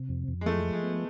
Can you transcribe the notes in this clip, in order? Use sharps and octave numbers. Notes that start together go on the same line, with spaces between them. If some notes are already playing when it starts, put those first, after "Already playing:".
Already playing: C3
F2
F2
G#3
F3 A3
F3
G#3
B3